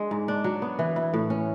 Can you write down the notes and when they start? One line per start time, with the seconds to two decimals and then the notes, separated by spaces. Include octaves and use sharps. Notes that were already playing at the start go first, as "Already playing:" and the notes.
Already playing: G#3 D4
0.11 G#2
0.28 D4
0.44 F#3
0.62 B3
0.79 E3
0.96 E4
1.14 A2
1.30 C#4